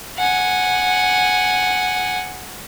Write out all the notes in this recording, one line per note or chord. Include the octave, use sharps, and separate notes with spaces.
F#5 G#5